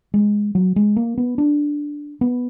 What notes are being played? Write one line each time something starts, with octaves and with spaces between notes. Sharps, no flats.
G#3
F#3
G#3
A#3
B3
D4
B3